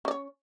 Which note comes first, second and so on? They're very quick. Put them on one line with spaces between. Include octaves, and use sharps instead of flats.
C#4 D5 C#5